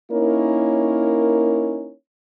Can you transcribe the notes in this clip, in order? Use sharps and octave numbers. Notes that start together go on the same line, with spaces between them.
A#3 C#4 D#4 E4 A#4 C#5